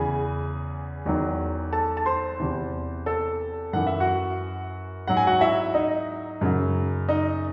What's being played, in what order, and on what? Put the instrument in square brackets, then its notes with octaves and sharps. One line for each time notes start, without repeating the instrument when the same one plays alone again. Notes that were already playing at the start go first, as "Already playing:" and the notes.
Already playing: [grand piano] E2 C#3 E3 G#4 G#5
E2 D#3 F#3
A4 A5
A5
C5 C6
E2 C3 E3
A4 A5
F#2 E3 F#5
E5
F#4 F#5
G#2 F#3 F#5
G#5
F#4 F#5
E4 E5
D#4 D#5
F#2 C#3 F#3
D#4 D#5